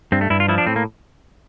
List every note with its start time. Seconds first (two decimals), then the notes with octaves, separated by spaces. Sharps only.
0.12 G2 C4
0.21 A3
0.30 G2 E4
0.40 F4
0.48 F3 E4
0.58 D4
0.67 A2 C4
0.76 A#3